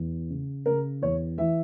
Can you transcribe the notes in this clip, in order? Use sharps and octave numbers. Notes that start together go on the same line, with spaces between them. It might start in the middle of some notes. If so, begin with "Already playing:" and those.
Already playing: E2
C#3
C#3 A#4
E2 C#5
E3 E5